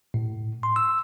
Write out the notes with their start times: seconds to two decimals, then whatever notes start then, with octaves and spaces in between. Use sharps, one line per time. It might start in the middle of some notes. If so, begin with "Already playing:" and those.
0.14 A2
0.63 C6
0.76 E6